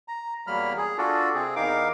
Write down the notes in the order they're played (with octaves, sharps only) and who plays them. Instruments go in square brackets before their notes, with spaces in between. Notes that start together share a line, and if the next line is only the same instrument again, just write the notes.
[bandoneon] A#5
E2 F#3 G3 A#3 B5 F6
G#4
D4 F4 F#4 A4 D5
C3 C4 G#4
E2 D#4 A#4 F5 D6